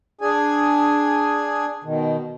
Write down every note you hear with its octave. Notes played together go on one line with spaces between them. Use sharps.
D4 G#4 G#5
B2 D#3